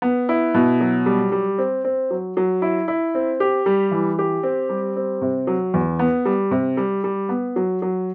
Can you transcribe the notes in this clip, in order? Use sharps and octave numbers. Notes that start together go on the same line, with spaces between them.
B3
E4
B2
F#3
G3
G3
C4
C4
F#3
F#3
E4
E4
C4
G4
G3
E3
G4
C4
G3
C4
C3
F#3
E2
B3
G3
C3
G3
G3
B3
F#3
F#3